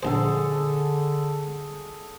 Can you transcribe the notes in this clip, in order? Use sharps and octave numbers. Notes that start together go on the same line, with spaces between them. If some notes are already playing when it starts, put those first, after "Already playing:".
A#1 D3 G#4 A4 C5